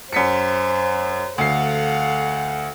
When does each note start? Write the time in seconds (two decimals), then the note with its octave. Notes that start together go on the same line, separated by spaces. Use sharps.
0.13 F#2 C5 B6 C#7
1.38 D2 A4 F5 F#5 C7